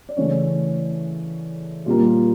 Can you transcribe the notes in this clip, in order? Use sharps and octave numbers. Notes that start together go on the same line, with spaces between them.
D5
C#3 E3 A3 C#5
A#2 G3 A#3